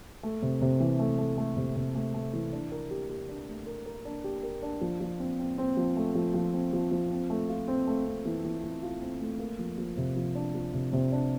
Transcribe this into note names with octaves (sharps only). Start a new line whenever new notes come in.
A3
C3
C3
E3
A3
A3
A3
C3
C3
A3
A3
E3
D4
A#4
G4
G4
D4
A3
A#4
A#4
D4
G4
A#4
D4
F3
F3
C4
C4
C4
F3
A3
F3
F3
C4
F3
F3
C4
A3
F4
C4
A3
C4
E3
E3
E3
F4
C4
A3
A#3
F3
F3
C3
F3
D4
F3
C3
C3
D4